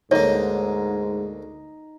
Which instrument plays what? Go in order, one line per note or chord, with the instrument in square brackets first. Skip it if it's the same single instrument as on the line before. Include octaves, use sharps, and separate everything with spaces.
[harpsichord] D2 A#3 [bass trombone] G#2 [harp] D#4 [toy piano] C#5